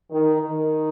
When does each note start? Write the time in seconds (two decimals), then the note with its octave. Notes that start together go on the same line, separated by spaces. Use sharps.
0.11 D#3
0.41 D#3